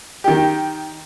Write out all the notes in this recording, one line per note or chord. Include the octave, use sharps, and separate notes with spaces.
D#3 G4